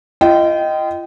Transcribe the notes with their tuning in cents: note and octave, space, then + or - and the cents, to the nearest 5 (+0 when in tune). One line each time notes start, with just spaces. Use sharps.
F4 -35 D#5 +0 G5 -20